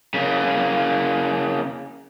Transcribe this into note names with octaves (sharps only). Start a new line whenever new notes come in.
C#3 A#3